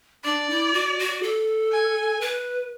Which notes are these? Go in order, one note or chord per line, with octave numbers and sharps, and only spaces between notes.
D4 D5
E4
F#4
F#4
A4
G#5
B4